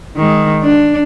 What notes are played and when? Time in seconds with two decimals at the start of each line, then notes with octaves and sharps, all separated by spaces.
0.17 D#3 G#3
0.64 D4